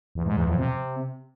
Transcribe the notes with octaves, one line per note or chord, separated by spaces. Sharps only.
E2
G#2
E2
F2
C3